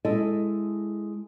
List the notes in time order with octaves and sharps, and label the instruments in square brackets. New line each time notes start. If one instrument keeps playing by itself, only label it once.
[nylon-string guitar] G#3 E4 A4 D#5